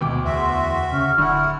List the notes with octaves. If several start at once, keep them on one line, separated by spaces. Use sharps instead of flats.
D2 B2 G5 D6
E2 F#4 E5 C6
C#3 C#6 F6
D1 D3 E4 F#5